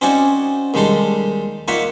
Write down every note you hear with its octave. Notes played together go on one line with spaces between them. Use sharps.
C4 C#4 D#4 F#4 D5 G#5
D#2 G3 G#3 D#4 A4 C6
A#3 D#4 F4 C#5 E5 F#5